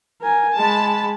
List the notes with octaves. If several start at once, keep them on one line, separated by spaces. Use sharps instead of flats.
A#4 G#5
G#3 A5 B5